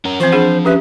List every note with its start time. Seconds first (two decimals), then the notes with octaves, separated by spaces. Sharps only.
0.05 C#4 A#4
0.20 E3 F3 C4 C5
0.32 D4 G#4 F#5
0.65 C#4 G4 B4 E5